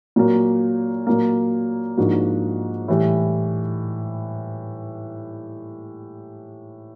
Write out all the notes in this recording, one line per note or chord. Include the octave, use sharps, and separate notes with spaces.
A#2 F#3 A#3
A#2 F#3 A#3
G#2 F3 A#3 D4 F#4
A2 E3 G3